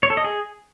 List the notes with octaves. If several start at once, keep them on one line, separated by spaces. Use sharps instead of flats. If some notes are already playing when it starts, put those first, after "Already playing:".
C#5
A4
D#5
G#4